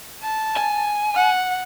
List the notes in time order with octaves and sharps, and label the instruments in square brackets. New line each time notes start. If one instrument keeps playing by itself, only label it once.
[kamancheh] A5
[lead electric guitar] G#5
[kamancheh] F#5